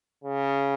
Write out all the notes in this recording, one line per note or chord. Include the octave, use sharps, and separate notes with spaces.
C#3